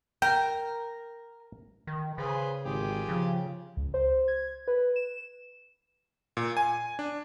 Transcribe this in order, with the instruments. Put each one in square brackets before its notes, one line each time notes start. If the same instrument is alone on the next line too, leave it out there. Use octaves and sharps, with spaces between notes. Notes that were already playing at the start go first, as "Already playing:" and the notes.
[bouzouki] A#4 [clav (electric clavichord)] G5
[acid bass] D#3
[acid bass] C#3 [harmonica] G#4 B4 C5
[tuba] G#1 [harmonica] F4 G4 G#4
[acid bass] C#3 [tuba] F3
[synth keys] C#2
C5
G#6
B4
E7
[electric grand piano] A#2
G#5
D4